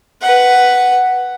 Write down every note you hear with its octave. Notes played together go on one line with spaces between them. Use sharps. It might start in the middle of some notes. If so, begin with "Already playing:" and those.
B4 F#5